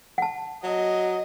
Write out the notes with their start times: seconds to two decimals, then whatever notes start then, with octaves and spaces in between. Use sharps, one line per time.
0.18 F#5 A5
0.64 F#3 D#5